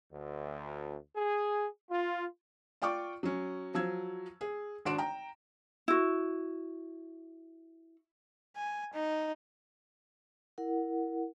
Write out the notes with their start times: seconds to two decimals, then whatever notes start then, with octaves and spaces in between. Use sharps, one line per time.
0.12 D2
1.15 G#4
1.91 F4
2.82 F4 D5 G5 C#6 D6
3.23 F#3 C#4
3.74 F3 F#3 E6 G#6
4.41 G#4
4.85 G#1 D4 F#4 C6 D7 E7
4.98 G5 A#5
5.88 E4 F#4
8.57 G#5
8.94 D#4
10.58 E4 A#4 F#5